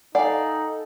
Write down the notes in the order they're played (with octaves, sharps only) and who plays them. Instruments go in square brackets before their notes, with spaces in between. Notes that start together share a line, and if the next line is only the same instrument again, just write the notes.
[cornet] D#4 [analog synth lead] A4 [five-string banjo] D5 F5 [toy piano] F#5 G#5 B5